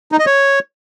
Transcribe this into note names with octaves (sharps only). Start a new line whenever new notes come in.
D#4
D#5
C#5